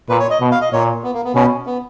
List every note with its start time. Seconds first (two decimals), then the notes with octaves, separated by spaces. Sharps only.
0.09 A#2 B4
0.20 C#5
0.30 D#5
0.41 B2
0.51 F5
0.61 D#5
0.72 A#2 C#5
1.04 B3
1.14 A#3
1.25 B3
1.35 B2 C#4
1.67 B3